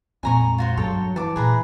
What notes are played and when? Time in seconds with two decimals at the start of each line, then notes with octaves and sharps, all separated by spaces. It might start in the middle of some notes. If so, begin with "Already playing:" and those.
0.23 F2 A#2 G#3 G#5 A#5 C#6
0.58 F4 F#4 C5
0.77 G2 F#3 A4 C#5 G5
1.16 E3 A5 D6
1.36 A#2 G#4 B4 A#5